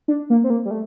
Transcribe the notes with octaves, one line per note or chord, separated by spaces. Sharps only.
D4
A#3
C4
A#3
G3
A3